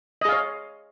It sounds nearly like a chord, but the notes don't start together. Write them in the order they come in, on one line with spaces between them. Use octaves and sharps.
D#5 G#4 F5 C#5